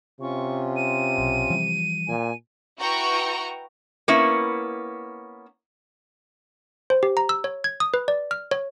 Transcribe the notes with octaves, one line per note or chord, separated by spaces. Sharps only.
C3 C#4 F4 C#6
D#7
B1
E3 F3 G3
A#2 G#5
E4 F#4 B4 G5 A#5 C#6
A#3 B3 C#4 E4
C5
G4
A#5
E6
C#5
G#6
D#6
B4
D5
F6
C#5